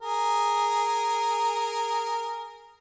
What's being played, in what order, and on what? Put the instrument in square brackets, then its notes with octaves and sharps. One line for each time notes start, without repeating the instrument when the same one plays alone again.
[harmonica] G#4 A#4